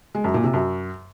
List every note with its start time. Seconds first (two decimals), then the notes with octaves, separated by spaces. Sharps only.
0.15 G#3
0.24 F#2
0.34 A#2
0.44 C3
0.54 F#2